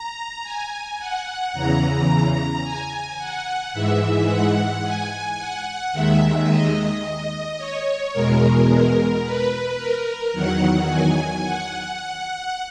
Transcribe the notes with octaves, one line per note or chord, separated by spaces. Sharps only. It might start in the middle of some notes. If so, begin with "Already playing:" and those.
Already playing: A#5
G#5
F#5
E2 C#3 E3 A#5
G#5
F#5
G#2 E3 G#3 E5
F#5
G#5
F#5
D#2 D#3 G#3 E5
D#5
C#5
E2 B2 G#3 A#4
A#4
B4
A#4
E2 D#3 F#3 F#5
G#5
F#5